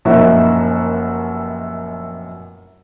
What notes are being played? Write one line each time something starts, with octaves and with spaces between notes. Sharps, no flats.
F1 F#2 A#2 D#4 E4 F#4